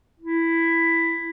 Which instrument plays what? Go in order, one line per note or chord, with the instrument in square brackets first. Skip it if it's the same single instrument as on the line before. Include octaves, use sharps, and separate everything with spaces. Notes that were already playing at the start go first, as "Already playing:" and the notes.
[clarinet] E4